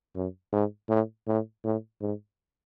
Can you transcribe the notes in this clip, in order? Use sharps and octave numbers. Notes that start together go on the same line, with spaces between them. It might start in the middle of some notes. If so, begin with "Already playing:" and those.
F#2
G#2
A2
A2
A2
G#2